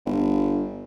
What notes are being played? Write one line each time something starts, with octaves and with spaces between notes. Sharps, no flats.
G1